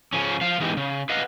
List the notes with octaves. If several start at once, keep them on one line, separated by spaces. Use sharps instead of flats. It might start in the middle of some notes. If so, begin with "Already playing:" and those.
C#3 F3 C#4
F3 F5
E3 G#3 B3 D#4 G4
C#3
B4 D#5 F5 F#5